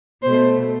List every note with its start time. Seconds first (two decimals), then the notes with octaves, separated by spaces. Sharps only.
0.22 B2 A3 C5